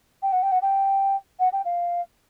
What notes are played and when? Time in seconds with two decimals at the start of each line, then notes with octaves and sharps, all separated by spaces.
0.22 G5
0.32 F#5
0.42 G5
0.52 F#5
0.62 G5
1.39 F#5
1.52 G5
1.65 F5